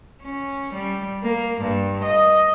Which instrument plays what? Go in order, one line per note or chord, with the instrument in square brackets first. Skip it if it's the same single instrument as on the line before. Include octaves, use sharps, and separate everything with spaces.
[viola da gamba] C#4
G3
A#3
G2
D#5